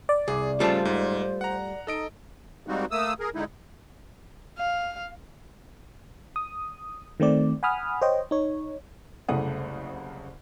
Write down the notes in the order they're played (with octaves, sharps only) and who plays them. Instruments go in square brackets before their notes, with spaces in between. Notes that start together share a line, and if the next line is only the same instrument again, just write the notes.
[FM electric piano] D5
[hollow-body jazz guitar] C2 [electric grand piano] G#4
[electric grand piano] C#3 A5 [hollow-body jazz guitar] G3 A3 F4 [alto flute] C5
[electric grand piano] G#2
F#5 A#5
[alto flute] D#4 [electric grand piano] A4 D#5 D7
[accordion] G3 G#3 A#3 C4 D#4 F#4
A3 A#3 D#6 E6
G#4 A#4
D3 G#3 D#4 E4
[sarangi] F5
[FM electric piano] D#6
D#3 A3 C4 D5
F#5 G#5 B5 D#6 F6
C5 C#5 D#5 G5
D#4 C#5
[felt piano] F#1 C2 C#3 A3 F#5 D#6